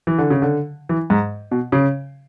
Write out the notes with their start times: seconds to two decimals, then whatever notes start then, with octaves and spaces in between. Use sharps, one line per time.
0.07 E3
0.18 D3
0.30 C#3
0.42 D3
0.89 E3
1.10 G#2
1.51 B2
1.72 C#3